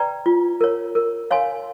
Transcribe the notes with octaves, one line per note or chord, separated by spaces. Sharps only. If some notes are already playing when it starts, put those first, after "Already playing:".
Already playing: B4 D5 G5 A#5
F4
A#4 C#5
A#4
C#5 F5 G#5 C6